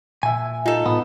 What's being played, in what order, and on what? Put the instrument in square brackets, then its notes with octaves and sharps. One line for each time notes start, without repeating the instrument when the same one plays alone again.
[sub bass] A#2 [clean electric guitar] E5 G#5
[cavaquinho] D#4 A4 [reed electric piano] F4
[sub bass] A2 [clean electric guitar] B3